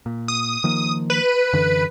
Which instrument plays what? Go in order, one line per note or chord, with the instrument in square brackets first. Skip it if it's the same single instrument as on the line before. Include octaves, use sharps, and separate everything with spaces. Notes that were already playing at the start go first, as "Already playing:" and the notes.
[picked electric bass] A#2
[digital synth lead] D#6
[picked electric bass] D#3 F3 A#3
[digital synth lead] B4
[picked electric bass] F#2 D3 E3